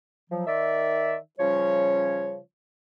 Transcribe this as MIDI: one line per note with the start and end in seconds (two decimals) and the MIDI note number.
0.30 0.43 53
0.30 0.43 54
0.47 1.16 51
0.47 1.16 74
0.47 1.16 76
1.40 2.39 49
1.40 2.39 53
1.40 2.39 55
1.40 2.39 61
1.40 2.39 73